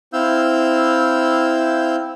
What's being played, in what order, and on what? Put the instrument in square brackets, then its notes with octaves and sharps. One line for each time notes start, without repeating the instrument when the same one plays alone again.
[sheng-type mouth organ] C4 E4 F5 E6 G6